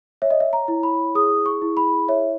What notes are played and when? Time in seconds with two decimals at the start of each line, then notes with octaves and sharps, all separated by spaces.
0.22 C#5 E5
0.30 D#5
0.40 E5
0.53 A#5
0.68 E4
0.83 B5
1.15 G#4 D#6
1.46 C#6
1.62 E4
1.77 B5
2.08 C#5 E5